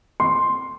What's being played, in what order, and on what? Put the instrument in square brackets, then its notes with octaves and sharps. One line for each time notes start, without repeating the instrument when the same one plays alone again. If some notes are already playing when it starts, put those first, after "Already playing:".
[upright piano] C6